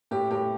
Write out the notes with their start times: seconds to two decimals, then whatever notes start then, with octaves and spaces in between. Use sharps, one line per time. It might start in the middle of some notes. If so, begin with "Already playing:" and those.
0.11 A2 G4
0.31 A2 G4